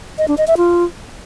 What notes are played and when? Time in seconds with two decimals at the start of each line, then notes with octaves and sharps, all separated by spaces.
0.18 D#5
0.28 D4
0.38 D#5
0.47 E5
0.57 F4